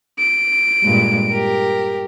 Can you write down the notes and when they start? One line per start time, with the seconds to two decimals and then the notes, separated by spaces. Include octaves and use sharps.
0.19 D7
0.83 G2 A#2 G#3
1.30 G4 A#4